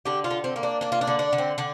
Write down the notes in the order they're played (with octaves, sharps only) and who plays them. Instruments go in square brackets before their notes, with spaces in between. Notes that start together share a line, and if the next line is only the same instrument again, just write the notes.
[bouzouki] D3 G4
F4
D3
C4
A#3
D4
A#3 D4
F4
D4
D3
D4
D3
C4
D3 D4